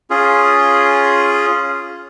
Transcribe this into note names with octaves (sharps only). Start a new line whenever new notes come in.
C#4 F4 G#4